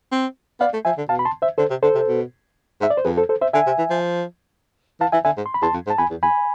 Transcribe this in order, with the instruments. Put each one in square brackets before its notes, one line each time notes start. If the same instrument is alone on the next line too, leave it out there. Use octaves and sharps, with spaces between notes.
[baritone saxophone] C4
[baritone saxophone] B3 [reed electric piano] D5 F5
[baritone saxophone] A3
[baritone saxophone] F3 [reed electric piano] E5 G#5
[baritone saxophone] D3
[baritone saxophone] B2 [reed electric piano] F5 A5
[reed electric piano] B5
A5 C6
C5 E5
[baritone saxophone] D3 [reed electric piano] A4 C5
[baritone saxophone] C3
[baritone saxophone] D3 [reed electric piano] A4 C5
[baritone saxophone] C3
B2
[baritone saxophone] G#2 [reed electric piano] E5
[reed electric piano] D5
C5
[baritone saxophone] F2 [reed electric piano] G#4 B4
[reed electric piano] A4 C5
A4 C5
C5 E5
[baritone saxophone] D3 [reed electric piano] E5 G#5
[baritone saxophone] C3
E3
F3
[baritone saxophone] E3 [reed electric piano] F5 A5
[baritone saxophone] E3 [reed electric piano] E5 G#5
[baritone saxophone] D3 [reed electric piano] E5 G#5
[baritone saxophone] G#2
[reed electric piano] C6
B5
[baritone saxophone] E2 [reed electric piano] A5 C6
[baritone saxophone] F2
G#2
[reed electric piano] A5
[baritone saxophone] F2 [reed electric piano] G#5 B5
[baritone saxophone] E2
[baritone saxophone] F2 [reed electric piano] G#5 B5